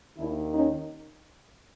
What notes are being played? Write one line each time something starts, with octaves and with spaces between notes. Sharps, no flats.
D#2 D#3 D4 E4
C#4 D#4